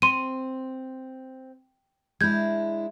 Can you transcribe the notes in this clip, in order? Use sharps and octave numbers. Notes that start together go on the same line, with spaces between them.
C4 C6 D#7
G#3 D4 E4 G6 G#6